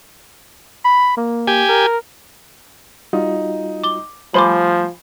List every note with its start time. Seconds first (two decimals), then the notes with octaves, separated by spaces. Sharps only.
0.85 B5
1.17 A#3
1.47 G4 G#5
1.68 A#4
3.13 G3 D#4 F4 F#4
3.84 D6 G7
4.34 F3 G3 A3 C5 G#5 B5 C6 D6